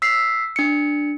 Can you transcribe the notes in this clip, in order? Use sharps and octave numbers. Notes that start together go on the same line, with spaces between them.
E6 B6 C7
D4 C#7